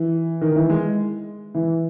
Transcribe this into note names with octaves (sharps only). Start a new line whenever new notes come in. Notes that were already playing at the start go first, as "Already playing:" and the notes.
Already playing: E3
D#3
E3
G#3
E3